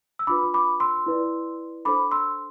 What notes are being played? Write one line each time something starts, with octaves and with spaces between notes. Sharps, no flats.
E6
D4 F4 B4 B5 D6
B5 D6
C6 E6
E4 B4 D5
D4 A4 C5 B5 D6
C6 E6